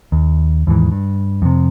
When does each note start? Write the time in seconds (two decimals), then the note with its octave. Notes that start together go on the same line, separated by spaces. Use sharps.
0.12 D#2
0.67 D#2 G#2 E3
0.92 G2
1.42 F2 C3